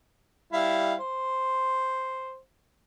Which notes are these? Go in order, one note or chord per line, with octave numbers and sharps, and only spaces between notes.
G3 E4 F5
C5